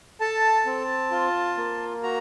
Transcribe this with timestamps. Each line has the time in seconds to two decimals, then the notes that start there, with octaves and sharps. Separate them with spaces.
0.20 A4 A5
0.66 C4
1.11 F4
1.57 A#3
2.03 F#4 A#5